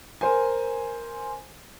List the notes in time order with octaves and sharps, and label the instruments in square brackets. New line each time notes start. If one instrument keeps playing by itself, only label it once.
[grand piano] A#4 C5 G#5